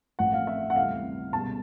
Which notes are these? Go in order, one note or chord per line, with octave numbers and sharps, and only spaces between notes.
A1 A2 F3 F#5
F5
E5
F#5
D2 C3 E3 G3 F5
C#2 B2 G3 A5